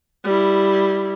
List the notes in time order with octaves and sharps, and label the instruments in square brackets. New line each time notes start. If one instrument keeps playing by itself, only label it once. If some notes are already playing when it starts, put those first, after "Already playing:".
[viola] G3 E4